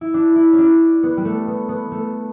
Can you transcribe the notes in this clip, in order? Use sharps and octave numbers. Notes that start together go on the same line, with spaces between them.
E4
D4
E4
C#4
D4
B3
G3
A3
B3
B3
A3